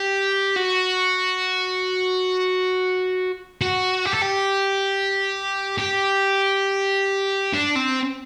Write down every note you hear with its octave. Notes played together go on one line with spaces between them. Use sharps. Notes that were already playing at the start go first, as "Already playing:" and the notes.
Already playing: G4
F#4
F#4
G4
A4
G4
G4
D4
C4